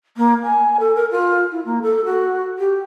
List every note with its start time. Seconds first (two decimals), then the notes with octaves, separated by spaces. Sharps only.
0.17 A#3
0.43 G#5
0.80 A4
0.95 A#4
1.11 F4
1.51 E4
1.65 A#3
1.82 A4
2.06 F#4
2.59 G4